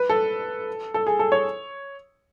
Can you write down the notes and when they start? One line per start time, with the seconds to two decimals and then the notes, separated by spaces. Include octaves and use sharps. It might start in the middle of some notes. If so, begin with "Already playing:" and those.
Already playing: B4
0.10 A4
0.94 A4
1.07 G#4
1.19 A4
1.32 C#5